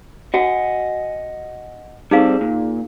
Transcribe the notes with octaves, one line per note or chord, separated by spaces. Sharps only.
F#4 D#5 F#5 G#5
G3 C4 D#4 G#4 A4 F5
A#2